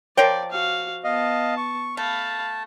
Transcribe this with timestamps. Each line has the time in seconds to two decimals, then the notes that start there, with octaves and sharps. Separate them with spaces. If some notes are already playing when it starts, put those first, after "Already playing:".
0.17 F3 A#4 C#5 D5 G5
0.51 F#4 F5
1.04 B3 D#5 F5 A5
1.57 C#6
1.97 A3 F5 A5 B5